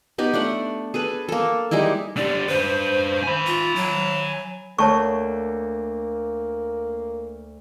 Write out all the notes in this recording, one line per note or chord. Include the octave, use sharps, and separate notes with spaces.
B3 D#4 G4
A3 D4 F#5
G#4 A4 B4
A#3 A4
G3 G#3 D#4 E4
D3 G4 D5
D4 B4 C5
G#5 B5
F4
F#3
D2 A#3 C#5 A5 C#6